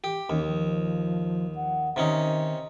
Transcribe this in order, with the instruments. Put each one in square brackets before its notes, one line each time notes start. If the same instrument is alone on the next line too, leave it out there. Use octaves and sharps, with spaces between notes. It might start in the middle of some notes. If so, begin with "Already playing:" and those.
[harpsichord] G4
[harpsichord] D#2 [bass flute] C#4
[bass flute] F3
F#5
[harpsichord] C3 C#4 D#4 [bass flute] D#3